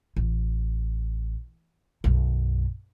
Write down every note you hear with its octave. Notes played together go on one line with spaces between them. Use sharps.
A1
B1 F#2